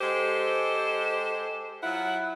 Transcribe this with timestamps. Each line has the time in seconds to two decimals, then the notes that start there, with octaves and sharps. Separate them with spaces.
0.01 G#3 G4 A4 C5
1.83 F#3 E4 F4 F#5